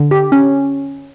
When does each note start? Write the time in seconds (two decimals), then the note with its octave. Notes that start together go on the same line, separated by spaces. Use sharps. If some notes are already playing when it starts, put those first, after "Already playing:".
Already playing: D3
0.11 G4
0.32 C#4